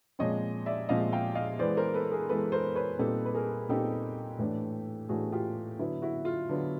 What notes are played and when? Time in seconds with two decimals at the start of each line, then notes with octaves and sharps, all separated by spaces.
0.19 A#2 F3 G#3 C4 C#5 D#5
0.66 D5 E5
0.89 A#2 F3 G#3 C4 D#5 F5
1.13 F5 G5
1.35 D#5 F5
1.59 E3 G#3 B3 C5 D5
1.77 A#4 C5
1.94 A4 B4
2.11 G#4 A#4
2.29 E3 G#3 B3 A4 B4
2.52 A#4 C5
2.75 B4 C#5
2.99 A#2 G3 C4 D#4 A4 B4
3.25 B4
3.34 G#4 A#4
3.69 A#2 G3 C4 D#4 G4 A4
4.38 A2 E3 A3 D4
5.09 A2 E3 A3 D4 F#4 G#4
5.32 F4 G4
5.79 D3 F#3 B3 E4
6.02 E4 F#4
6.25 F4
6.49 D3 F#3 B3